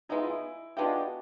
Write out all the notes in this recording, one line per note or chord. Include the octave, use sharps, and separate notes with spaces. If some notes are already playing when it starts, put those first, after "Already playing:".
G#3 B3 D#4 E4
F4
E4
G#3 B3 D4 F4 G4
F#4